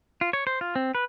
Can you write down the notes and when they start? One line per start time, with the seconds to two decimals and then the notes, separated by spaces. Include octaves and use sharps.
0.21 F4
0.33 C#5
0.47 C5
0.61 F4
0.76 C4
0.95 B4